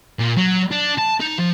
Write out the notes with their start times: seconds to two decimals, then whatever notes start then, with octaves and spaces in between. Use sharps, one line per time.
0.19 A#2
0.37 F#3
0.72 D4
0.98 A5
1.20 D#4
1.38 F3